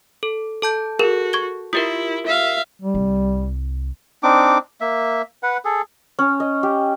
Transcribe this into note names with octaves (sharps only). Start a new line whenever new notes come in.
A4
A4 A5 G6
F#4 G#4 A#4 E7
C#6 G#6 G7
E4 F4 G4 A#4 D#6
E5 F5
G3
C2
C4 D4 D#4 D6
A#3 E5
B4 F#5
G#4 A4
C#4
D#5
G4